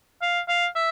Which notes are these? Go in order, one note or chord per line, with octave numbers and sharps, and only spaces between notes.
F5
F5
E5